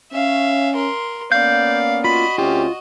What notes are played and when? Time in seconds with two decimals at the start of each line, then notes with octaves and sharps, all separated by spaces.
0.12 C#4 E5 F5
0.76 A#4 C6
1.32 A#3 B3 C#4 D5 F5 G6
2.04 F4 F#4 D#5 B5
2.38 D2 C4 C#4 F4 G4